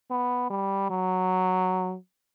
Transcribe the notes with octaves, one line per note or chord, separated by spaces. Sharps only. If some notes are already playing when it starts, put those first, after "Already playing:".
B3
G3
F#3